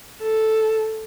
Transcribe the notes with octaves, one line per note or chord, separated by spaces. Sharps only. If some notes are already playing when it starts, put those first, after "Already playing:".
A4